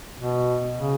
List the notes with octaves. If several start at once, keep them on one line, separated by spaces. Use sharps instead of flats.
B2
C#3